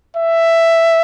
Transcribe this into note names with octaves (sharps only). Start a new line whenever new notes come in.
E5